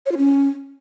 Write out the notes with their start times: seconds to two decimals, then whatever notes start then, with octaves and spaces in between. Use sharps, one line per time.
0.06 C#5
0.12 F4
0.17 C#4